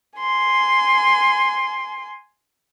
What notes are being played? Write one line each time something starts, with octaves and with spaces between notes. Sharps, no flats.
G#5 C6